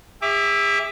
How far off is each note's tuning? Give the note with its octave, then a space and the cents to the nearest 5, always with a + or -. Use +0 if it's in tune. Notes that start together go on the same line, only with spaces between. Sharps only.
G#4 -45 E5 +0 D6 -15